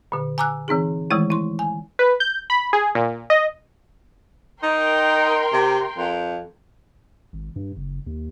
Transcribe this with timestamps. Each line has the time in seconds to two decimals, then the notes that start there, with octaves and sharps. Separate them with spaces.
0.12 A#2 D3
0.38 G#5 A#5 D6 E6 F#6
0.68 E3 C4 D#4 G#4
1.11 D#3 E3 G#3 A3 E4
1.30 E4 C6
1.59 G#5
1.99 B4
2.20 G6
2.50 B5
2.73 G#4
2.95 A#2
3.30 D#5
4.63 D#4 A#4 G5 C6
5.53 C3
5.98 F2
7.33 G#1
7.56 G2
7.77 F#1
8.06 D#2